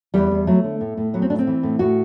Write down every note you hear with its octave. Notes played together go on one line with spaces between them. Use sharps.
E2 G3
E2
F#3 A3
D3
A2
A2
F#3 B3
C4
A2 D4
C4
E3
A2
A2 F#4